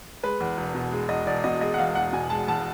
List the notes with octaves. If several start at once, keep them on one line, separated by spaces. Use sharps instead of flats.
G#3 B4
E2
E1
B2
G#3
E2 D#5
E1 D5
B2 D#5
G#3 D#5
F#5
E2 F5
E1 F#5
B2 G#5
G#3 A5
E2 A5